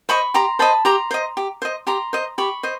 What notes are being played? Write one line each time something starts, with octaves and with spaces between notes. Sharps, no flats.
C5 D#5 B5 C#6
G4 A#5 C6
C5 D#5 A5 B5
G4 A#5 C6
C5 D#5
G4
C5 D#5
G4 A#5 C6
C5 D#5
G4 B5 C#6
C5 D#5